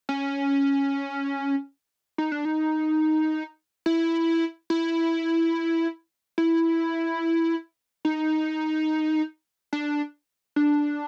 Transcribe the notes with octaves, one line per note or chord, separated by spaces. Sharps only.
C#4
D#4
D4
D#4
E4
E4
E4
D#4
D4
D4